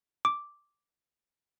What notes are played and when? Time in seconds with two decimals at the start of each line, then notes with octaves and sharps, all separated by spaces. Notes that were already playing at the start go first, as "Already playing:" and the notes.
0.25 D6